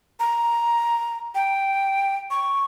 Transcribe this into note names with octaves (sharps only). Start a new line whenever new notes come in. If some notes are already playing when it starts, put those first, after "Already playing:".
A#5
G5
C#6